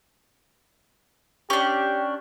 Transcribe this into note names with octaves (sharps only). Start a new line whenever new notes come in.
C#4 D4 G4